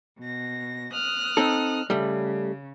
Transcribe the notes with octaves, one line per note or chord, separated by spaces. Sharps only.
B2 A#6
D#6 F6 F#6
C4 D#4 A4
C#3 G3 A3